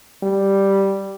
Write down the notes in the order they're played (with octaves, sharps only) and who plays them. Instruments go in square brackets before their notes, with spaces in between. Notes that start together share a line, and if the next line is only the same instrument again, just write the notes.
[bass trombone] G3